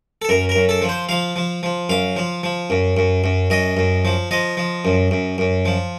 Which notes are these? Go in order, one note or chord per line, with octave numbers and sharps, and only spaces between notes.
A4
F#2 A#4
A#4
F#2
A4
F3
C5
F3 F5
F3
F3
F#2 F5
F3
F3
F#2
F#2
F#2
F#2 D#5
F#2
F3
F3 D#5
F3
F#2
F#2
F#2
F3